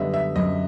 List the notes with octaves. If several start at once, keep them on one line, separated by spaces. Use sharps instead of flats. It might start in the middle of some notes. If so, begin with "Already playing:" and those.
Already playing: F#2 D3 G3 B3 D#5 E5
E5
F#2 D#5